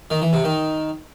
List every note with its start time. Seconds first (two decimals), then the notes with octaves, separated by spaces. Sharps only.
0.10 D#3
0.22 E3
0.33 C3
0.44 D#3